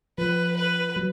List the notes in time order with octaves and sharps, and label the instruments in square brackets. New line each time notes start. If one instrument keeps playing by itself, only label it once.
[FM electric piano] F3 [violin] B4
[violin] B4
[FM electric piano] F#3